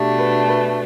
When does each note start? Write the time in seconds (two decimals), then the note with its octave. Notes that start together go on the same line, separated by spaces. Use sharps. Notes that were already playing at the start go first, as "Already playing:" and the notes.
Already playing: B2 A3 D4 G4
0.18 B4
0.48 B4